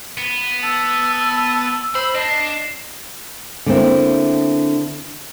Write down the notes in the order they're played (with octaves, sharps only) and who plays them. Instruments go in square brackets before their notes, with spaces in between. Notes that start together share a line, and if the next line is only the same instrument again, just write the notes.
[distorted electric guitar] B3
[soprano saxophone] A5 [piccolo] E6
[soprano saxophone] C5 [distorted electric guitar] B5
[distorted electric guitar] D4 [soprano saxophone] D#5 [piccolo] C7
[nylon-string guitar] D3 A#3 C4 E4